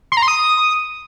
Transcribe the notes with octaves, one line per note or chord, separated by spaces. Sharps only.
C6
A#5
C6
D#6